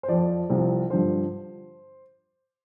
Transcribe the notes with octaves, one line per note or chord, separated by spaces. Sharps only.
C5
F2 F3 D5
C2 C3 F3
G2 D3 F3 C5